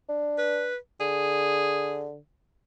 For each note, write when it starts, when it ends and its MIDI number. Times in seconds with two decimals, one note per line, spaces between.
0.09 0.67 62
0.38 0.76 71
1.00 2.18 50
1.00 2.05 68